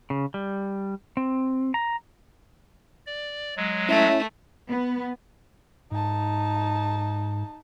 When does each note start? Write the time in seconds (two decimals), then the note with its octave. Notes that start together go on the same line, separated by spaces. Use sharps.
0.10 C#3
0.34 G3
1.17 C4
1.74 A#5
3.07 D5
3.57 F#3 G#3
3.89 A3 C#4 E4 E5
4.69 B3
5.91 G#2 D#4 A5